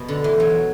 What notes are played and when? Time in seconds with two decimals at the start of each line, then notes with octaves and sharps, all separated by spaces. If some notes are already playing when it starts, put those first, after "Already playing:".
Already playing: B2
0.08 D3
0.24 E3
0.40 F#3